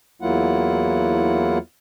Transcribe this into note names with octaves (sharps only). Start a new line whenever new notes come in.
E2 F#3 A#3 E4 F4 F#5